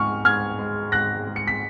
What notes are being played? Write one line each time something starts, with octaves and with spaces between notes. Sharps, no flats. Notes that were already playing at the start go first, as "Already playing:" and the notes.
Already playing: G#2 F3 G#3 G#5 C#6 F6
G#2 F6 G#6
G#3
G#2 F#6 A#6
G#3
C#7
B6